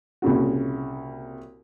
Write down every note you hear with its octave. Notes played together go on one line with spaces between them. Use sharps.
C2 A#2 C#3 F#4